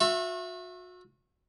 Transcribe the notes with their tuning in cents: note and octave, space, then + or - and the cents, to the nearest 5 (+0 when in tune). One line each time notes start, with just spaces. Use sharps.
F#4 -35 E5 +15 C#6 -40